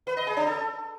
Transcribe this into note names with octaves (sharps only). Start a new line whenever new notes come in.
B4
D#5
G#4
D4
A4